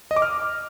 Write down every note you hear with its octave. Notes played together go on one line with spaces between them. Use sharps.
D#5
D6
F6